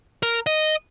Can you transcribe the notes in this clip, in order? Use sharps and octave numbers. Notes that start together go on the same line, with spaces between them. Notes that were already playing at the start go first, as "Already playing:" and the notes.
A#4
D#5